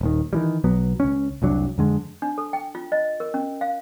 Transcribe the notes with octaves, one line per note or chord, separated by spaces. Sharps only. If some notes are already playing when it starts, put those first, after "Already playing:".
D#1 D#2 D#3
D#3 E3 G3
B1 F#3 B3
C#2 C#4
F1 C2 F#3 D4
F2 D3 G#3
D4
A4
G5
F4
D#5
A#4
C#4
F5